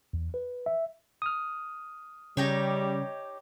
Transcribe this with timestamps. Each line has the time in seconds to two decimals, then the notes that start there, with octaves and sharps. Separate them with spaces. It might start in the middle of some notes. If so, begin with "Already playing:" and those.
0.13 E2
0.34 B4
0.66 E5
1.22 D#6 F6
2.37 C#3 G3 D#4 G4 C#5